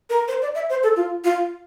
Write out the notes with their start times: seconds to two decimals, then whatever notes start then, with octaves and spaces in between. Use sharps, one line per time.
0.10 A#4
0.28 C5
0.42 D5
0.55 E5
0.70 C5
0.83 A4
0.96 F4
1.24 F4